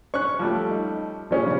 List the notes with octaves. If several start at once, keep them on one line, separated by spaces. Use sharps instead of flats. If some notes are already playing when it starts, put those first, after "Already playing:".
C#4 C#6 F#6
F3 G3 A3
D#4
A#2 G3 C#4 G#4
F2 C#3